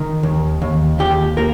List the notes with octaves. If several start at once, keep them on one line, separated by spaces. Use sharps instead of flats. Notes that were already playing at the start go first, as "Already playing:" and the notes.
Already playing: D#3
D#2
D#2
D#2 G4
A#3 A#4